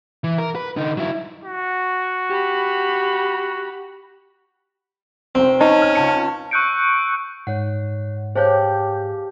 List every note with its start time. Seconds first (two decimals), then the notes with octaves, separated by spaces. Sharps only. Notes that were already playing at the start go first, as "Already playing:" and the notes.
0.24 E3
0.38 A#4
0.55 B4
0.77 D3 D#4
0.97 F#3 E4
1.44 F#4
2.30 G4 B5
5.35 F1 C4 G5
5.61 C#4 D#4 A5
5.82 F6
5.95 C#2 A5 C#7
6.51 C#6 E6 F#6 G6 C#7 D7
7.47 G#2 C#5 F#5
8.35 G4 G#4 C5 C#5 F5 A5 G6